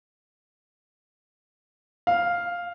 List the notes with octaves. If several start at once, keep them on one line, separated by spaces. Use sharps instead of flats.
F5